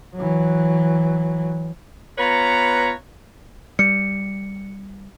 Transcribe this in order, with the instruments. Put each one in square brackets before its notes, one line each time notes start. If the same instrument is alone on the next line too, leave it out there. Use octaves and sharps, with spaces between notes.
[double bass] E3 F#3
[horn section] B3 F4 B4 C#5 A#5
[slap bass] G3 [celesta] C#7